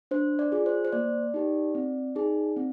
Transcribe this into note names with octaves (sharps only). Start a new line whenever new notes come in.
D4 C5
D5
F4 G#4
C5
C5
A#3 D5
D#4 G4
C4
D#4 G#4
C4